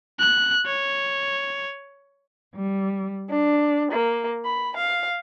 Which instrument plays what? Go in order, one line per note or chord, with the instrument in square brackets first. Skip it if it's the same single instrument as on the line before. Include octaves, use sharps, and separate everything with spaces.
[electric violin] F#6
C#5
[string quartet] G3
D4
A#3
B5
F5